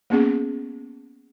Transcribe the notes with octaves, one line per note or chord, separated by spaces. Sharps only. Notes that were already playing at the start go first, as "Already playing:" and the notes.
A#3 B3 C#4 G#4